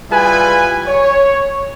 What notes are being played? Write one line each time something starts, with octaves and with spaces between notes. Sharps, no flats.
G3 E4 F4 G#4 B4 G#5
C#5